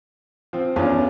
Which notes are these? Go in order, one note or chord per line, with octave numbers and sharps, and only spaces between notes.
F3 C4
E2 C#4 D4 F4